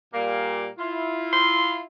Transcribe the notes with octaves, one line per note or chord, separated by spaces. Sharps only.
A#2 G3 A#3
E4 F4
C6